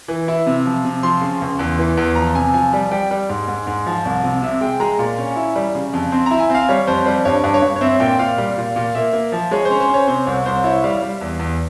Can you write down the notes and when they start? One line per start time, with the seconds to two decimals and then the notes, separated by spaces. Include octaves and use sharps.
0.08 E3
0.28 E4
0.47 C3
0.65 F3
0.85 C3
1.03 F3 C6
1.21 C#3
1.41 C#2
1.59 E2
1.78 E3
1.97 E2
2.16 F3 A#5
2.35 C3 G#5
2.53 F3 G#5
2.73 G3
2.91 G3 G5
3.11 G3
3.29 G#2
3.48 G#2
3.67 G#2
3.86 F3
4.05 C2
4.23 C3
4.42 C3 E5
4.61 G#3 G5
4.80 G#3 A#5
4.99 A#2
5.18 C#4
5.36 E4
5.56 G3
5.75 C#3
5.93 F2
6.12 C4 C6
6.26 E4 A#5
6.40 G#5
6.50 C4 F5
6.69 G3 C#5
6.87 F2 C5
7.06 G3 C5
7.25 G2 C#5
7.44 G2
7.54 C#5
7.62 G2
7.76 C#5
7.81 C4 E5
8.00 A#2 G5
8.19 A#2 F5
8.38 G3
8.58 A#2
8.76 A#2
8.95 A#3 E5
9.13 A#3
9.32 F3
9.51 G#3 C#5
9.65 C5
9.71 C#4
9.80 C5
9.89 C#4 C#5
10.07 C3 C5
10.27 C2 C#5
10.46 C2 C5
10.64 E4 C#5
10.84 G3 F5
11.02 G3
11.21 E2
11.39 E2